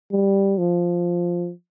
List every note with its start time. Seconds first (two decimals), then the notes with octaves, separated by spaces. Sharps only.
0.12 G3
0.58 F3